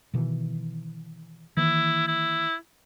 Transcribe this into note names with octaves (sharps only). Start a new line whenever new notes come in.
B2 D#3 E3
D#3 E3 A#3 E4
E4